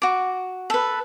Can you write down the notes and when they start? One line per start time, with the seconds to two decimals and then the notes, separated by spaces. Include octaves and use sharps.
0.02 F#4 D6
0.70 A4 B4